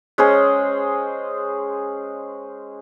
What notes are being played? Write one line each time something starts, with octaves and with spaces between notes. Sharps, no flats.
G#3 C#4 G#4 C5